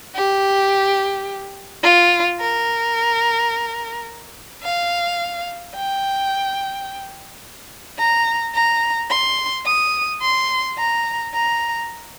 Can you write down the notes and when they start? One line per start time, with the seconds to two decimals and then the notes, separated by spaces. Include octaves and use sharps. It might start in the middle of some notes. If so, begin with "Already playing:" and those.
0.15 G4
1.83 F4
2.40 A#4
4.63 F5
5.75 G5
7.99 A#5
8.54 A#5
9.11 C6
9.66 D#6
10.22 C6
10.78 A#5
11.34 A#5